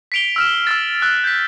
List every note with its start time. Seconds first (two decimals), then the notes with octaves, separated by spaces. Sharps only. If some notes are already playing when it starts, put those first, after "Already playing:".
0.12 B6 C7 D7 F7 G7
0.36 E6 F6 E7
0.67 E6 F6 A6
1.02 E6 F#6
1.24 G6 B6